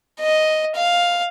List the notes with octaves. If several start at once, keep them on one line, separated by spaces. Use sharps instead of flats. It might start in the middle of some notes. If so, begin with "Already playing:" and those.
D#5
F5